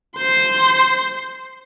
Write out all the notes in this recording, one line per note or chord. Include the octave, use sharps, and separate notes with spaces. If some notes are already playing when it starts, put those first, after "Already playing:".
C5 C6